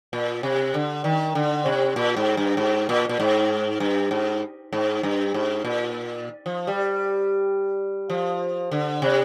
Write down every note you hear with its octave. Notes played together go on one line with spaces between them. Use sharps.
A#2
C3
D3
D#3
D3
C3
A#2
G#2
G2
G#2
A#2
A#2
G#2
G2
G#2
G#2
G2
G#2
A#2
F3
G3
F3
D3
C3